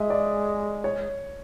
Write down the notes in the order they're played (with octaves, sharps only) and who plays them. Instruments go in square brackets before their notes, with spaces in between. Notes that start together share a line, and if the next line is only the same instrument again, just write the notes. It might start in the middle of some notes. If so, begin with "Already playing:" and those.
Already playing: [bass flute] G#3 [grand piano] D#5 E5
[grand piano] D5
C#5